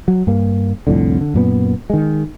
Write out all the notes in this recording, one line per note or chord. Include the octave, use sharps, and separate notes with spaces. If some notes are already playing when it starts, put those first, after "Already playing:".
F#3
G2 A#3
C2 F2 A2 D3
D3
F#2 A#2 B3
D#3 G#3